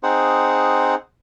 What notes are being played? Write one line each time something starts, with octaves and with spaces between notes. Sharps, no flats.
C4 D#4 G#4 C5 F#5